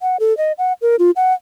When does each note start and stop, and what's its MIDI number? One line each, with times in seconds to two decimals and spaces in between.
0.01 0.17 78
0.20 0.36 69
0.37 0.52 75
0.58 0.73 78
0.82 0.96 70
0.99 1.11 65
1.16 1.33 78